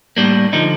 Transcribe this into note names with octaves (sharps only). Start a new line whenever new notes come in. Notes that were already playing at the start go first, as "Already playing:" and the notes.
A2 G3 A#3 D4
D3 F3 D#4